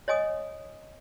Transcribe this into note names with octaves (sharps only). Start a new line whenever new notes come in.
C#5 D#5 G#5 D#6